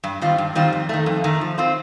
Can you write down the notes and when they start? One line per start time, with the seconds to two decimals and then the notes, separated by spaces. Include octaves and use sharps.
0.04 G2
0.21 D#3 G3 C4 F4
0.38 G2
0.55 D#3 G3 C4 F4
0.72 F2
0.89 D#3 A3
1.06 F2
1.24 D#3 A3
1.41 F3
1.58 C4 F4 C5